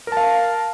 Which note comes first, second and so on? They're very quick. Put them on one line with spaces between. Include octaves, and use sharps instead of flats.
A#4 A5 F5